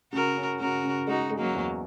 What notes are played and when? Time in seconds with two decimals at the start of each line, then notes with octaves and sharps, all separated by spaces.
0.13 C#3 F#4 A#4
0.36 C#4
0.60 C#3 F#4 A#4
0.84 C#3
1.07 G#3 D#4 F#4
1.31 G#3
1.39 F#3 A#3
1.54 E2